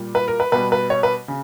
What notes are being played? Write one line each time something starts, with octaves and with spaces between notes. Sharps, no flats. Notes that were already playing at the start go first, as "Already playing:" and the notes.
Already playing: A#2 G3
B4
A#4
B4
B2 G3 B4
B4
C#5
B4
C#3